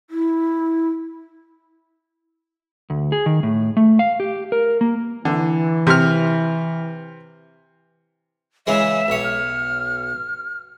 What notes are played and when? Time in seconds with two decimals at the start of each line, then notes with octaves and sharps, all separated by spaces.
0.10 E4
2.90 D2
3.12 G#4
3.26 D#3
3.43 A2
3.77 A3
3.99 F5
4.20 G4
4.52 A#4
4.81 A#3
5.25 D3 E3
5.87 C3 F6
8.67 C#3 E3 G#3 E5
9.08 B1 C#5
9.24 F6